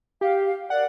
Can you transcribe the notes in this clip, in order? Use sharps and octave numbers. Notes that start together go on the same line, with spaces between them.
G4 F5
A#4 D5 F#5